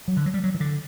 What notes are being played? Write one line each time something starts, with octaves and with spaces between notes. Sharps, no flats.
F#3
D3
F#3
G3
F#3
E3
D3